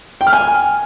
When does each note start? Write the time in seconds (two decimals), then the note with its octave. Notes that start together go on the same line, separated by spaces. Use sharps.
0.21 G5
0.27 F6
0.33 G#5